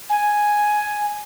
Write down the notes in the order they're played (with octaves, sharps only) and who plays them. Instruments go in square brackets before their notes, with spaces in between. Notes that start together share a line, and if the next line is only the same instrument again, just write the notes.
[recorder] G#5